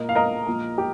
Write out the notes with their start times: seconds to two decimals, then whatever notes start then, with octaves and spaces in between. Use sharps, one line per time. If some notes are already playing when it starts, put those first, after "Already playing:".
Already playing: A#2 A#3 A#4 D#5
0.09 F5
0.15 A#4 D#5
0.47 A#2 F3 A#3
0.78 G4